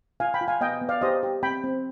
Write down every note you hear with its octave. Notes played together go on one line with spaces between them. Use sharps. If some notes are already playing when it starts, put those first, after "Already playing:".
F4 F5 G#5
G5 B5
F4
F5 G#5
B3 D#5 G5
B3
D5 F5
G4 C5 D#5
G4
C4 G5 B5
C4